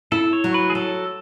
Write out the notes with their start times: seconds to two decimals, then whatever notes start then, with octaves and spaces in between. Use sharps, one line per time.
0.12 E4 A4
0.33 C#5
0.44 F#3
0.54 B4
0.70 G#4
0.75 F#3 A4